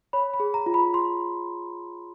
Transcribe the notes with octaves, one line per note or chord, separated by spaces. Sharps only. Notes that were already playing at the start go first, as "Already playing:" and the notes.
C#5 B5
B5
G#4
A#5
F4
B5
F4 C6